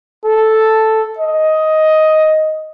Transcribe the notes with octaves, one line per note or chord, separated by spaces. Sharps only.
A4
D#5